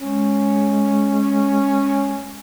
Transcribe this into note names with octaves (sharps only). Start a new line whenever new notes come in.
G#3 C#4